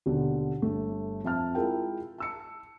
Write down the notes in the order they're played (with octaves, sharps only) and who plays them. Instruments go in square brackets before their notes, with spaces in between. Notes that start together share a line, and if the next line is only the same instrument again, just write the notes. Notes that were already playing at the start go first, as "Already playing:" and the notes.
[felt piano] D#2 B2 D3
G1 A3
F2 E5 A5 F6
G#3 E4 F4 A#4 G5
A5 E6 C#7